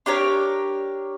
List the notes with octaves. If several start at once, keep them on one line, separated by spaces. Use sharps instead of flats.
D4 G4 A#4 C#5